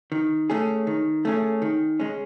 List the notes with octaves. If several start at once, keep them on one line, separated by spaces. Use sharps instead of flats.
D#3
A3 C#4 G#4
D#3
A3 C#4 G#4
D#3
G#3 C#4